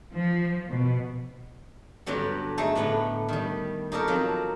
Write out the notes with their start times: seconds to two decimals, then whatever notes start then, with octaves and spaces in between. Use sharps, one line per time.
0.12 F3
0.68 B2
2.06 G2 D3 F#3 G3 B3
2.58 A3 D#4 G#4 A4
2.75 A2 D3 B3 F#5
3.29 D#3 G3
3.92 D#4 G4 A4 A#4 C#5
4.08 F3 F#3 C4